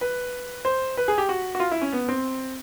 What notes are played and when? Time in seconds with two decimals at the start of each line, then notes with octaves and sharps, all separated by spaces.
0.01 B4
0.65 C5
0.97 B4
1.08 G#4
1.18 G4
1.29 F#4
1.55 F#4
1.60 F4
1.71 E4
1.82 C#4
1.92 B3
2.08 C4